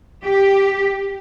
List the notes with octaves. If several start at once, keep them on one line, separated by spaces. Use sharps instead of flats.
G4